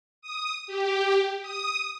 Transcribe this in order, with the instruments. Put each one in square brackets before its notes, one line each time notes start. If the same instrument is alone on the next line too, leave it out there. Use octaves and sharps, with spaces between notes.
[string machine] D#6
G4
D#6